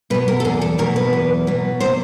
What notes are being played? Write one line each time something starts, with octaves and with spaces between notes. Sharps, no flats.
B2 F#3 B3 B4
A#4
A4
E2 G#4
A4
B2 F#3 B3 A#4
B4
E2
B2 F#3 B3
C3 C5